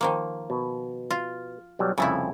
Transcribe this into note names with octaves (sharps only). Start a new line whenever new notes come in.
D#3 F3 A#3
B2
F4
B1 F#3 G3
C2 F2 C#3 A3 E4 G#5